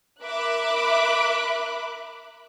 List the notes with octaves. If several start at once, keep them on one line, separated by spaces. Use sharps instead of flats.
A#4 E5 B5 D6 F#6